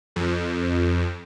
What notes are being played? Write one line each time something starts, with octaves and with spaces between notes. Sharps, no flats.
F2